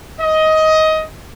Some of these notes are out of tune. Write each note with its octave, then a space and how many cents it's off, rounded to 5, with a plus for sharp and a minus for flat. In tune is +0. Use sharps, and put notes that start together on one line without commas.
D#5 +15